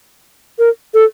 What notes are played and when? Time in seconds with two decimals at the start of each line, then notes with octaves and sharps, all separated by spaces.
0.59 A#4
0.94 A4